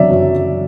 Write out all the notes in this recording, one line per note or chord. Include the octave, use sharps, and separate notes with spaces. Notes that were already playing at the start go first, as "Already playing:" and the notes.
Already playing: F#1 D3 F#3 D5 E5
F#2